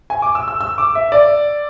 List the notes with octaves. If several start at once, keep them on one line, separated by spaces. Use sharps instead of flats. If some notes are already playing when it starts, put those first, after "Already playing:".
G#5
D6
E6
E6
E6
D6
E5
D5